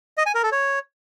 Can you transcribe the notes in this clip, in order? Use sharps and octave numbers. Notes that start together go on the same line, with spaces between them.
D#5
G#5
A#4
A4
C#5